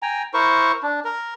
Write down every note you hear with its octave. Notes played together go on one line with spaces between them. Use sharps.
G5 G#5 A#5
E4 A#4 C5 C#6
D4
A#4